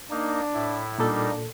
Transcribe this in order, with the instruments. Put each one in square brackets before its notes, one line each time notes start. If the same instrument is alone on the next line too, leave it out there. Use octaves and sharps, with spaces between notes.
[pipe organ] A#3 D#4 [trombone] D4
[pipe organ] A2 E4
[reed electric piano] A#2 A4 [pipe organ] G3 A#3 D#4 [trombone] D4